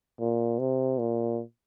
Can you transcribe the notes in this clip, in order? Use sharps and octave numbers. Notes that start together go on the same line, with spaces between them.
A#2
C3
A#2